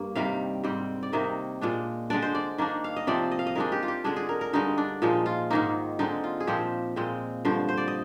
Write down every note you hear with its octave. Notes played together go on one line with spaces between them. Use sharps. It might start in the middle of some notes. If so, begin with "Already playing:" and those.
Already playing: G2 A#3
C3 D#3 G3 F5
G#2 G3 C4
D5
C3 D#3 A#3 D#5
A#2 G#3 D4
D3 G#3 D4 D5
C5
D5
D#3 A#3 D4
F5
D#5
C3 F3 C4 D5
D#5
F5
D#5
D#3 G#3 D4 A#4
G4
F4
G4
D3 G#3 D4 G#4
G#4
A#4
A#4
G2 D3 G#3 D#4
D4
A#2 F3 G#3 D#4
F4
G#2 D#3 A#3 D#4
D3 G#3 C4 D#4
F4
G#4
A#2 F3 C4 G4
A#2 G#3 C4
G2 D3 F3 C5
C5
D5
D#5